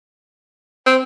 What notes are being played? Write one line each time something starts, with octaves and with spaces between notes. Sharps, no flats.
C4